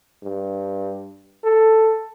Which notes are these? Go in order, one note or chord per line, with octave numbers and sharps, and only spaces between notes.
G2
A4